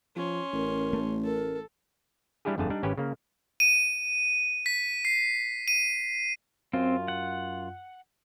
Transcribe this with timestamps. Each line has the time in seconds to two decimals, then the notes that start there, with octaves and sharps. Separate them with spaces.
0.16 F3 C#4 C6
0.53 A1 A#4
0.93 A3
1.24 A4 A#4
2.45 G3 D4 E4 G4 G#4
2.58 G1 F2 D3 A3 G#4 A5
2.70 G3 D4 D#4
2.83 G#1 C#4 G4 B4 G#5
2.98 C#3 A#3
3.60 D#7
4.66 B6
5.05 C7
5.68 D#7
6.73 F#2 C4 F4
7.08 F#5